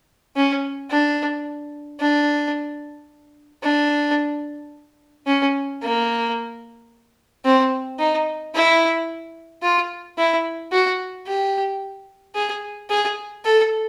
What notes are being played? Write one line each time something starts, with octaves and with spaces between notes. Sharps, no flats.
C#4
D4
D4
D4
C#4
A#3
C4
D#4
E4
F4
E4
F#4
G4
G#4
G#4
A4